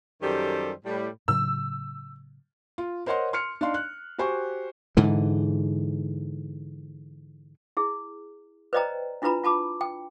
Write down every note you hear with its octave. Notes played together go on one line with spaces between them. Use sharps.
F#2 D#3 G3 G4 A4 C5
A2 G3
A2 C#3 F#3 E6
F4
A#4 C5 C#5 D#5 F#5 C6
C6 F6 C#7
D4 D#4 F5 C6
F#6
F#4 G4 C5 G#5 C#6
G#2 D3 E3
E4 G#4
B4 C5 D5 D#5 G5 A#5
D4 E4 F4 B4 A#5 B5
F4 A5 B5 D6
G5